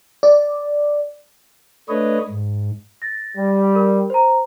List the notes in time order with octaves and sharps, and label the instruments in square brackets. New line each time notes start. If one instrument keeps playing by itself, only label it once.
[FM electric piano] D5
[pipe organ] A3 D4 B4 C#5 D#5
G#2
[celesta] A6 A#6
[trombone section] G3
[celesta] A#4
C5 A#5